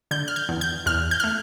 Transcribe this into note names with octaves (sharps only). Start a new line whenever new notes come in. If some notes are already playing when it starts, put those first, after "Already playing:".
D3 G6
F6
G6
E2
G6
E2 F6
G6
F6
A3